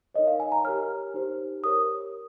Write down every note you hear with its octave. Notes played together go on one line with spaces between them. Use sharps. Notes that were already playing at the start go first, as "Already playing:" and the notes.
D#4 A#4 C#5 D#5
F5
G#5
A#5
G4 A#4 C#5 F6
D#4 G4 C5
G4 A#4 C#5 D#6